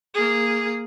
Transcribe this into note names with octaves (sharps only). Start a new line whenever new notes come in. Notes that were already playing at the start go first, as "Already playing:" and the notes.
A#3 G#4